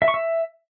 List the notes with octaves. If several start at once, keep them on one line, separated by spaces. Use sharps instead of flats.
E5
C#6
E5